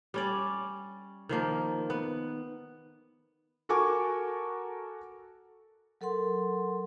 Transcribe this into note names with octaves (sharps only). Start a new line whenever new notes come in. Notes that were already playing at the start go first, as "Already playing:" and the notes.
G3 C#4 D5
D#3 F3 A#3
B3
F#4 A4 A#4 G#5 C#6 D6
F#3 A4 A#4 F#5 C6